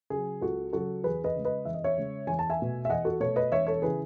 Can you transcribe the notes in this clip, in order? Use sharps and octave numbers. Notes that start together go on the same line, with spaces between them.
C#3 F#3 G#4
C#2 F#4 A4
C#3 F#3 F#4 A4
E2 G#4 B4
B4 D#5
C#3 G#3
B4 D#5
E2 E5
D#5
C#5 E5
C#3 G#3
E2 G#5
A5
E5 G#5
B2 A3
E5
E2 D#5 F#5
F#4 A4
B2 A3 A4 C#5
B4 D#5
E1 C#5 E5
A4 C#5
C#3 E3 G#4 B4